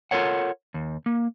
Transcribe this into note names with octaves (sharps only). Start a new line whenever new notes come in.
F4 A4 A#4 C#5 F#5
D#2
A#3